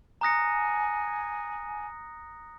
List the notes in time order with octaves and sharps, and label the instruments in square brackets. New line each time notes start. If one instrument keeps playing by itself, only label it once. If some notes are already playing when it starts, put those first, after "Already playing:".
[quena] G#5 [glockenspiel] A#5 D#6 F#6 A#6 C#7